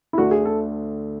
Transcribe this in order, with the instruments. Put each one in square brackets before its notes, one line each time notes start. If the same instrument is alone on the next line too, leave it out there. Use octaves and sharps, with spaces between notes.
[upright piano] E4
[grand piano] D2 D3 A3 D4 [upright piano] F#4
[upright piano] G#4
A4